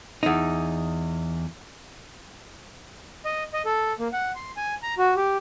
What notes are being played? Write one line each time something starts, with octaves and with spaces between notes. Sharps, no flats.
E2 D#4
D#5
D#5
A4
A#3
F#5
C6
G#5
A#5
F#4
G4